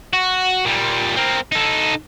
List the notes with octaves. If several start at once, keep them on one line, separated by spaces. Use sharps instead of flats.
F#4
A#2 G3
C4 A#4
D#4 A4